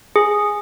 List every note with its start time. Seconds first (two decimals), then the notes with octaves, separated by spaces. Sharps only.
0.16 G#4